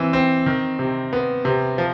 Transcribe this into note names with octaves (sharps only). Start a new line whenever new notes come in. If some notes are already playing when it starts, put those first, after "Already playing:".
Already playing: E3 C4
C4
D#3
C3
B3
C3
F3